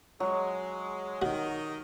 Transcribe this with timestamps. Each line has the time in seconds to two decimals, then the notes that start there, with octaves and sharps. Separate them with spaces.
0.20 F#3 G#3
1.22 D#3 F#4 D#5